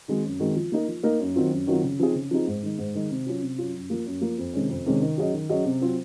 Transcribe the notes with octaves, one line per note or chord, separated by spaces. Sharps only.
D#3 G#3 C4 F#4
F#2
D#3 G#3 C4 F#4
F3
A#3 D#4 A#4
F3
A#3 D#4 A#4
F#2
D#3 F#3 C4 F4
F#2
D#3 F#3 C4 F4
C#3
F3 C4 D#4 G#4
C#3
F3 C4 D#4 G#4
G#2
D#3 G#3 D#4
G#2
D#3 G#3 D#4
C3
F#3 C#4 F4
C3
F#3 C#4 F4
F#2
F3 A#3
F#2
F3 A#3
F2
C3 D#3 G#3 C#4
F2
C3 D#3 G#3 C#4
D#3
F#3 C#4 G#4 D#5
D#3
F#3 C#4 G#4 D#5
C3
F#3 C4 F4